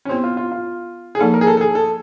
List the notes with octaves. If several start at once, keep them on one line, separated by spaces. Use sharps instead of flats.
C#4
B3 C4 E4 G4
F4
F4
F4
G#4
F3 A#3 D#4 A4
A#4
G#4
A4
A4
G#4
A4